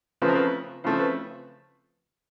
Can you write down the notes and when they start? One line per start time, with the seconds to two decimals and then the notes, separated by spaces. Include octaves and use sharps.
0.22 C#3 F3 A3 C4 B4
0.28 A#4
0.35 B4
0.84 C#3 F3 A3 C4 C5
0.99 B4